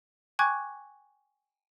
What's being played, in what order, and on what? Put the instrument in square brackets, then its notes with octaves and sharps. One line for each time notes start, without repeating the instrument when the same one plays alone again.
[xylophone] G5 G#5 C#6 D6 F#6 G#6